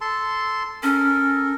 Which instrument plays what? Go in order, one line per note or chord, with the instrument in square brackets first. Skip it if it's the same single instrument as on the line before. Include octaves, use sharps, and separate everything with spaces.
[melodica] A4 A5 C6
[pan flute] C#4 [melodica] A4 A#4